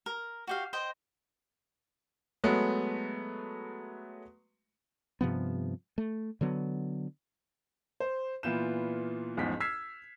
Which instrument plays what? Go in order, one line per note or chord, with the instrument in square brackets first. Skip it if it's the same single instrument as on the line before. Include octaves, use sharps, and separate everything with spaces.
[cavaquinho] A#4
F#4 G4 F5
C5 D#5 G5
[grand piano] F#3 G#3 A3 B3
[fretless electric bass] G2 C3 F3 B3
A3
D3 F#3 B3
[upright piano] C5
A#2 E3 B3 F4 G6 E7
A1 E2 G#2 F3 B6
E6 F6 G#6 B6 C7 E7